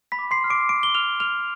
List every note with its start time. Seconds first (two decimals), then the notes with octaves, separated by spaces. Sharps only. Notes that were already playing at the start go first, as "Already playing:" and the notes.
0.12 B5 B6
0.19 D6
0.31 C6 C7
0.44 F6
0.50 D6 D7
0.69 C6 D6 D7
0.83 G7
0.95 F6 F7
1.20 F6 F7